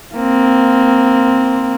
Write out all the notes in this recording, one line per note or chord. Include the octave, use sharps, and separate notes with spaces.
A#3 C4